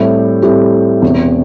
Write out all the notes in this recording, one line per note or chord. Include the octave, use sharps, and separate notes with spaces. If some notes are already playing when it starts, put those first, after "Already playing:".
Already playing: A2 G3 C4 E4 G4
A2 G3 C4 E4 G4
E1 E2 C3